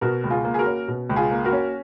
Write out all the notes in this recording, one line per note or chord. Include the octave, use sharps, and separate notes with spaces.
B2 F#4 A#4
C#2
F4 G#4
A#3
G#4
F#4 A#4
C#4
B2
C#2
F4 G#4
A#3
F#4 A#4
C#4